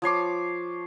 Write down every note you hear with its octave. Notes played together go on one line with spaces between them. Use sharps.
F3 C#5 C6 D6